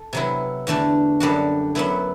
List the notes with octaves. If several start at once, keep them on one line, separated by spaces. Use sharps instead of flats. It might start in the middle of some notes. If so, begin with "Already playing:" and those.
Already playing: A4
C3 F#3 B3 E4
E2 D3 A3 D4
F#2 D3 G3 D4 F#4
F#2 F#3 B3 E4